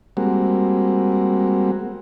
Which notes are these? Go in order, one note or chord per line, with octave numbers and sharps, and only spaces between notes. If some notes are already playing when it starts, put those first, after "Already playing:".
G3 G#3 A#3 C4 F#4